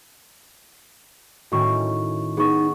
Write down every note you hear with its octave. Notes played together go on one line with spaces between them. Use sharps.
A2 D#3 C#4 F#4 C#6
B3 D#4 G#4 C#6